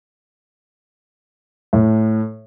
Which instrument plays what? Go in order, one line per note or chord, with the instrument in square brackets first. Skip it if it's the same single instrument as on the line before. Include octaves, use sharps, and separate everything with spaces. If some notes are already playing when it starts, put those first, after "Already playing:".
[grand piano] A2